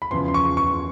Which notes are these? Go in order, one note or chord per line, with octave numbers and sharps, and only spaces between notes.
B5
E2 C#3 F3 C6
C6
C#6
C#6